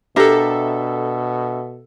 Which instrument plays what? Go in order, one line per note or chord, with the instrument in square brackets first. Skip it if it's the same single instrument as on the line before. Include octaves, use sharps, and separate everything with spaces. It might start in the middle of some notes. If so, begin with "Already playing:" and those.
[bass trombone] B2 [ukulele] D4 G4 A#4 [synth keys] A4 E5